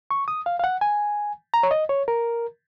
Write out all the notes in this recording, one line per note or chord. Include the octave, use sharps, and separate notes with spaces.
C#6
D#6
F5
F5
F#5
G#5
A#5
C#5
D#5
C#5
A#4